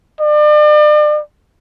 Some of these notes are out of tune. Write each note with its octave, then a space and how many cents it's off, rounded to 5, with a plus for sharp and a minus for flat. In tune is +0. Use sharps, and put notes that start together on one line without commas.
D5 +40